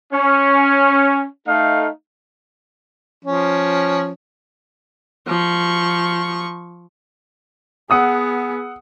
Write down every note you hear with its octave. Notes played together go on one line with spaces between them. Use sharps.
C#4
A3 D#4 F5
F3 C#4
F3 C#6
B3 G#4 F#5 D#6 E6